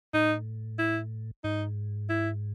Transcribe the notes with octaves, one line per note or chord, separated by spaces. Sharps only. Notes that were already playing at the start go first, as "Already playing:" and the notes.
A2 D#4
E4
G#2 D#4
E4